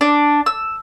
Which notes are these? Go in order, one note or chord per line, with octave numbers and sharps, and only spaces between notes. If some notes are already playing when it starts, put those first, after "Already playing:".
D4
E6